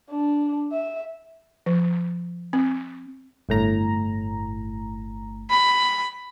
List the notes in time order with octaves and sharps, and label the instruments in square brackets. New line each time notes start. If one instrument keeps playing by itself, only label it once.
[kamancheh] D4
E5
[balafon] F3
C4
[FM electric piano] G1 A2 A#5
[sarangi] B5